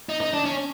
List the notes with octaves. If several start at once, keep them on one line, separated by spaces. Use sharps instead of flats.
D#4
D#4
D4
C#4